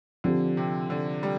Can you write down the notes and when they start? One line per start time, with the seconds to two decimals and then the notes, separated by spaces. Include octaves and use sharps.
0.24 D3 F3 C4 G4
0.57 C3
0.90 D3
1.23 G3